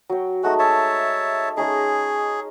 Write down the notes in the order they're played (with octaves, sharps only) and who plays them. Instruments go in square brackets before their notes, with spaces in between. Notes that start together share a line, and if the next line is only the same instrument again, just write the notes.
[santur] F#3 G5
[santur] G#3 A3 D#4 [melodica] F#4
[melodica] C#5 E5 A5
[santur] G#3 C#4 D#4 [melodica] G#4